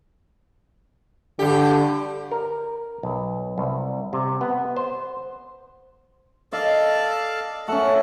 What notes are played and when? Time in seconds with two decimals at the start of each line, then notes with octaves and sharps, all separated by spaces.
1.39 G2 D3 G4
2.31 A#4
3.03 B1
3.58 C2
4.13 C3
4.41 B3
4.77 C5
6.53 A4 D5 D#5 F5
7.68 A3 C#4 A4 F#5